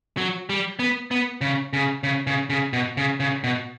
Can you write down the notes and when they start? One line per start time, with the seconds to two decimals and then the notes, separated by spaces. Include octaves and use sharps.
0.17 F#3
0.50 G3
0.79 B3
1.11 B3
1.41 C#3
1.73 C#3
2.03 C#3
2.27 C#3
2.50 C#3
2.73 B2
2.97 C#3
3.20 C#3
3.44 B2